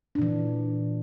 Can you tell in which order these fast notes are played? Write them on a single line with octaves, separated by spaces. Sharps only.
D4 A#2 E3